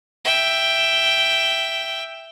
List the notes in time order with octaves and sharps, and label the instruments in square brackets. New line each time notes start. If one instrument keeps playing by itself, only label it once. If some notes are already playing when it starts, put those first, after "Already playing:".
[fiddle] E5 G5